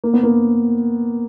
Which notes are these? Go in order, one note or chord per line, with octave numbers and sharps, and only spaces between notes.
A#3
B3
A#3